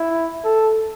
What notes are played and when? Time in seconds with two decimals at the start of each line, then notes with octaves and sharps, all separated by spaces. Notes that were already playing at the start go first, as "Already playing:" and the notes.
Already playing: E4
0.44 A4